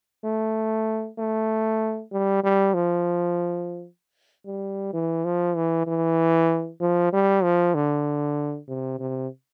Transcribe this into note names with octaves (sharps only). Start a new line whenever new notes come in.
A3
A3
G3
G3
F3
G3
E3
F3
E3
E3
F3
G3
F3
D3
C3
C3